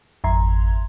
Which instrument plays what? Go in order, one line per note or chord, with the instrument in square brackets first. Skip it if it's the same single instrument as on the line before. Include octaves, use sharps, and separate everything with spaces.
[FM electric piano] G#1 F2 E5 A#5 C6 G#6